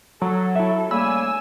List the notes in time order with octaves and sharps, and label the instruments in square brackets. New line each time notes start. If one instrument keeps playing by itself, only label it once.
[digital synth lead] F#3 [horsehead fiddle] A4
[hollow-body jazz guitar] E4 E5
[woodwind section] C#3 G3 A#3 [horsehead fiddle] A3 G#5 [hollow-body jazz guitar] B5 [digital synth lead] E6